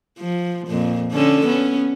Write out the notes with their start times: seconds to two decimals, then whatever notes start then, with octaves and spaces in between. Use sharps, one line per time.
0.19 F3
0.68 F2 A#2
1.12 D3 C#4 A4
1.47 B3 C#4